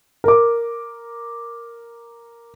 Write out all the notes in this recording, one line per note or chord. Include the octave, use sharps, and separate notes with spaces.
A#4 D6